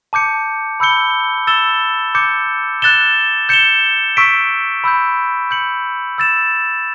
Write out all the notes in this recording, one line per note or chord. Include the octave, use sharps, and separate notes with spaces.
A5 D6 G6 C#7
B5 E6 G6 C#7 G7
E6 A6 E7 G7
D6 G6 C#7
F#6 A6 E7 G7
G6 C#7 E7 G7
C#6 E6 B6 D7
B5 E6 G6
G6 C#7 F#7
E6 A6 E7